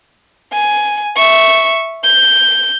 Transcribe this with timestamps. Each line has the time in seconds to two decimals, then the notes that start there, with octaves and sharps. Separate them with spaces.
0.52 G#5
1.16 E5 C#6
2.04 G6